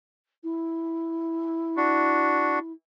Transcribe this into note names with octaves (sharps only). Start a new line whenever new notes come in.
E4
D4 F#4